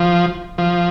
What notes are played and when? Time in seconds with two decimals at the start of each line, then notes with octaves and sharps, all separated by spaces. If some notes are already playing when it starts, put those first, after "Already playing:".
Already playing: F3
0.58 F3